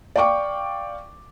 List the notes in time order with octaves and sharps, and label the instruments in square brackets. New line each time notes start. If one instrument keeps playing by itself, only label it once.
[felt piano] D5 F5 G5 C#6 D6